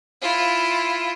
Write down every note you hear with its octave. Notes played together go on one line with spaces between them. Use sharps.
E4 F4